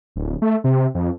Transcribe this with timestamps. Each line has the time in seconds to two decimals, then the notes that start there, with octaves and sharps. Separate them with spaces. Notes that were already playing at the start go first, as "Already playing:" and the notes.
0.16 D1
0.42 A3
0.64 C3
0.95 F2